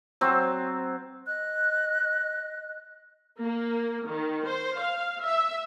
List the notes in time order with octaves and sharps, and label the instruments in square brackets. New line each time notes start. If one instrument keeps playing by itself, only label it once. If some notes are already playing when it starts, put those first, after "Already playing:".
[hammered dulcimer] F#3 C4
[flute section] D#5 F#6
[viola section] A#3
D#3
C5
F5
E5